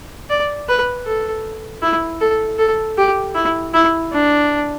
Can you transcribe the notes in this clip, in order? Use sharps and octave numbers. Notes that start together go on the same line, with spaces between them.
D5
B4
A4
E4
A4
A4
G4
E4
E4
D4